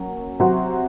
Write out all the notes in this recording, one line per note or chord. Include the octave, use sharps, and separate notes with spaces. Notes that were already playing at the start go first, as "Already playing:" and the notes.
Already playing: F#3 A#3 C#4
C3 F#3 C4 F#4